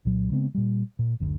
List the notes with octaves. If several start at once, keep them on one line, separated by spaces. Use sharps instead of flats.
C2 A#2 F#3
C#3 G#3 B3 C4
A#2 G3
A#2
F#1 D2 A2 D3